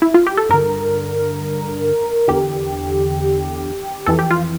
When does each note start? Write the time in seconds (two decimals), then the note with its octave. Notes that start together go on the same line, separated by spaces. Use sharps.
0.02 E4
0.14 F4
0.27 G4
0.37 A4
0.49 G2 D3 A#4
2.28 E2 D3 G4
4.06 F2 E3 A4
4.19 G4
4.31 F4